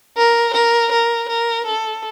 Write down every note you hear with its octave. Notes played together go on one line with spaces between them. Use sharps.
A#4
A#4
A#4
A#4
A4